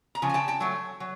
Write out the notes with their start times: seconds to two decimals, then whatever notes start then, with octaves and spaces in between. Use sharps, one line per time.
0.15 A#5
0.22 C#3 F3
0.29 G#5
0.34 G5 A5
0.48 G5 A5
0.60 F#3 A3
1.00 F#3